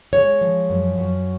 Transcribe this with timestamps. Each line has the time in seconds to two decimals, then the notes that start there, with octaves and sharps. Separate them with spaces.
0.13 G#3 C#5
0.41 F3
0.70 F#2
0.98 F#2